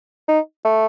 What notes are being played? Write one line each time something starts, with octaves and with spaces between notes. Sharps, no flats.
D#4
A3